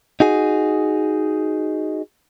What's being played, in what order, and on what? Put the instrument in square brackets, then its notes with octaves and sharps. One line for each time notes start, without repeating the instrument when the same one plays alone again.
[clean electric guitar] D#4 F#4 G#4